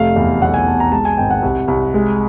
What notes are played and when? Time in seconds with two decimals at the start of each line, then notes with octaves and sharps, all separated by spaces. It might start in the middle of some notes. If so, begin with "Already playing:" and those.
Already playing: F1 A3 F5
0.16 E2
0.42 B1 F#5
0.54 G#5
0.67 B1 A5
0.80 A#5
0.92 G#3 A5
1.05 G#5
1.18 G#1 G5
1.30 F#5
1.42 C2
1.68 C2
1.94 G#3